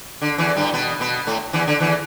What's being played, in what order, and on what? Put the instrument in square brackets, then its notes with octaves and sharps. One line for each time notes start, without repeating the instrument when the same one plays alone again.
[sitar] D3
E2 E3
G2 G3
B2 B3
B2 B3
A2 A3
E2 E3
D3
E2 E3